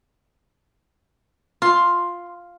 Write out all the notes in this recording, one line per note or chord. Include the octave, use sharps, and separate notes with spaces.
F4 C6